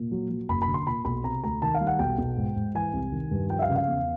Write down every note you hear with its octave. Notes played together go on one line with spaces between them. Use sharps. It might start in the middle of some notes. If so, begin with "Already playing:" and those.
Already playing: A#2
F#3
F#3
F#1 B5
B5
D3
C6
A#2 B5
B1 B5
C3 A#5
D2 A#5
D#3 A5
F5
G3
F#5
B1 G5
B1
G#2
G#2
E3 G#5
C2
D#3
G2
F3 G5
E5
F5
C#3
F5
E2